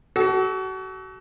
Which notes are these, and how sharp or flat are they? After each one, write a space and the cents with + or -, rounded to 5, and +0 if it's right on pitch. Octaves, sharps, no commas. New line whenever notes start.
F#4 +35 A4 -30